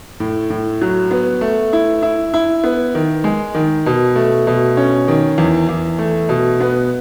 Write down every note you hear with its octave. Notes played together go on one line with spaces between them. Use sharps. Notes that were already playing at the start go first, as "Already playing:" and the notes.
A2
A2
F#3
B3
A3
E4
E4
E4
B3
D#3
G#3
D#3
B2
A3
B2
C#4
D#3
E2
E2
A3
B2
B3